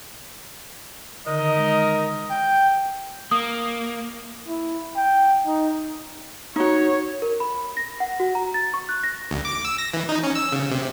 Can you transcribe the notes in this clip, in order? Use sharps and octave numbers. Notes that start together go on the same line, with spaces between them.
D3 D#3 D#4 A#4 D#5
G#3
G5
A#3 D#6
E4
G5
D#4
D#4 F#4 C#5
A#4
B5
A#6
F#5
F#4
A#5
A6
C#6
F#6
A#6
D2
D6
E6
A#6
E3
D#4
C#4
E6
C#3
C3